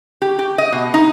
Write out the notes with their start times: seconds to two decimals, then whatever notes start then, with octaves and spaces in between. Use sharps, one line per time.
0.22 G4
0.39 G4
0.58 D#5
0.72 B2
0.94 D#4